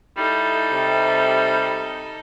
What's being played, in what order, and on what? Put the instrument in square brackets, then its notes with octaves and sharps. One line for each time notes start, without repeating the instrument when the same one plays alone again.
[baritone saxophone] G3 [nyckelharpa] D#4 A4 [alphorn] E4
[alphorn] C3